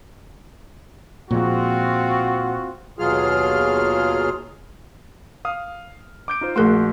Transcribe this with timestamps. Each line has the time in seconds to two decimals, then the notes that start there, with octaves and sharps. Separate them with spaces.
1.31 A#2 F3 G#3 C4 F4 F#4
2.99 D#2 B2 F#3 F4 G#4 F6
5.45 F5 D#6 F6
6.28 D6 G6 D7
6.41 D#4 F4 C5
6.56 A#1 A3 F#4 G#4 A#4 C6